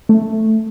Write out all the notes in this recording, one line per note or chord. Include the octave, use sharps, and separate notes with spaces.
A3